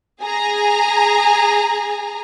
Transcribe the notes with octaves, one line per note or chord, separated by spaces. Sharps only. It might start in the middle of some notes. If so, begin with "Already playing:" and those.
G#4 G#5 A#5